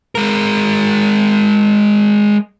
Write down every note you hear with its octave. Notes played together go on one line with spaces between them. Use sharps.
G#3 A#4